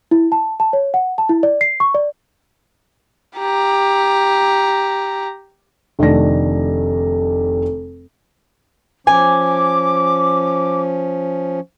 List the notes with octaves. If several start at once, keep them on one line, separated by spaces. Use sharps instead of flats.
E4
A5
A5
C#5
F#5
A5
E4
D5
C7
C#6
D5
G4 A#5
F1 D#3 A3 D4 A#6
F3 C#4 G#5 D6